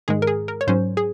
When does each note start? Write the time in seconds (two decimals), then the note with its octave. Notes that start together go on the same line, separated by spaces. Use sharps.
0.08 G#2 D#3 G#3 G#4
0.22 A#4
0.27 G#4
0.48 A#4
0.61 C#5
0.67 G#2 F#3 C#4 C5
0.97 G#4